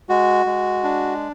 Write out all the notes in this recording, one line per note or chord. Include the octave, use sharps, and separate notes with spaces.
G#3 F#4
G#3
D4